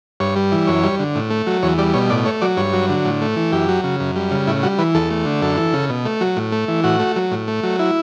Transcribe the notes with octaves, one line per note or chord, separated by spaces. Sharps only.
G2 C#5
G3
E3
F#2 C#5
G3
D3
A2
A3
F#3
E2 C#5
G3 D5
B2 C#5
A2 D5
A3 C#5
F#3 D5
G2 C#5
F#3
D3
A2
A3
E3
F#2 G4
F#3
C#3
F#2
G3
C#3
A2 E4
G3 F#4
E3 B4
E2 A4
A3
D3
F#2 A4
E3
C#3
B2
A3
F#3
A2
A3
E3
A2 F#4
A3
F#3
A2
A3
F#3
E4